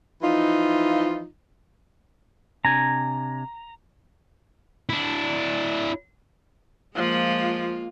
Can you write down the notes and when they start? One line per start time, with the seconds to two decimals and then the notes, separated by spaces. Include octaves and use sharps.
0.22 E3 F3 D#4 F4
2.65 C3 D4 G#5 A#5
4.89 D4 E4
6.96 F3 G#3 A#3 F4